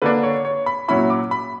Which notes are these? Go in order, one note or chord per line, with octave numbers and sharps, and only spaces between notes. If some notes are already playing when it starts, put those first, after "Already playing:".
D3 A#3 D4 B4
C#5
C#5
B5
A#2 F#3 C#4 E4 B5
D6
B5